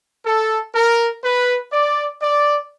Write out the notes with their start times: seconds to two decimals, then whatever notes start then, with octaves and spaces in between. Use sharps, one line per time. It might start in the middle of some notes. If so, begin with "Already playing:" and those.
0.25 A4
0.73 A#4
1.23 B4
1.72 D5
2.21 D5